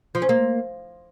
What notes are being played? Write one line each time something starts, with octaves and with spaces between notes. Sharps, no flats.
F3
C#4
A#3